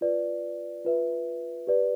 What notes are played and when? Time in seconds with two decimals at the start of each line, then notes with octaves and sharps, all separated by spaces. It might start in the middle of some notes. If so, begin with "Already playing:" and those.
0.01 F4 B4 D5
0.85 F4 B4 E5
1.67 G4 B4 D5